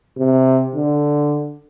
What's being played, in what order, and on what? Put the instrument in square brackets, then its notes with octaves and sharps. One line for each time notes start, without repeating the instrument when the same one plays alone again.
[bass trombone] C3
D3